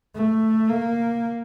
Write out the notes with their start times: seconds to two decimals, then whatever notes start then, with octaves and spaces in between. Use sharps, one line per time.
0.15 A3
0.69 A#3